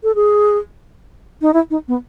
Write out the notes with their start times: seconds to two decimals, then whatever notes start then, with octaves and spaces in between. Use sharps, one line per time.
0.03 A4
0.15 G#4
1.41 D#4
1.54 E4
1.70 D#4
1.88 B3